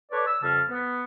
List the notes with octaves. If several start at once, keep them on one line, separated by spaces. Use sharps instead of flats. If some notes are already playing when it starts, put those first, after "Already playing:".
A4 B4 C#5 D5
E6
F2 C#3 G3 A5 F6
B3